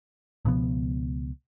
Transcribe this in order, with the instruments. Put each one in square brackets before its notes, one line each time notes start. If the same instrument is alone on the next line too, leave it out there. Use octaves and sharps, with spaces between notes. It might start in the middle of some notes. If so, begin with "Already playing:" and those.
[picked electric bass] C#2 B2 F3 B3